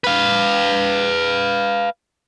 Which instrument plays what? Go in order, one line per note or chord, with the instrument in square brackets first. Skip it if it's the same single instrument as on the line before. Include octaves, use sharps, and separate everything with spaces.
[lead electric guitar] B4 F5